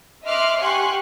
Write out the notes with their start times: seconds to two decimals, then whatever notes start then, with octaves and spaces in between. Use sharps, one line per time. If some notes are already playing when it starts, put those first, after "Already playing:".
0.24 D#5 E5 C6 D6 F6 F#6
0.59 G4 F#5 G#5 C6 C#6 F#6